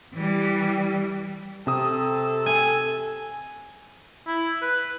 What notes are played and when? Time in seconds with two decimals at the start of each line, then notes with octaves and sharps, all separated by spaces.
0.14 E3 G3
1.67 C3 A4 D#6
2.46 G#5
4.27 E4
4.62 B4